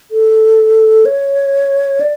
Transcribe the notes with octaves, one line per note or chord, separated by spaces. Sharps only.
A4
C#5
D5